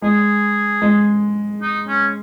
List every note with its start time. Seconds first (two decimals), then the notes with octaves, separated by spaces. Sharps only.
0.02 G#3 G#4
0.82 G#3
1.62 D#4
1.88 C#4